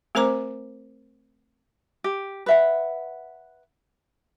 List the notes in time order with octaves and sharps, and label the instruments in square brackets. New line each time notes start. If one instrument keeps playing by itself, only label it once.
[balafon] A3 C4 A#4 C5 A#5 D6
[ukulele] G4
B4 E5 F#5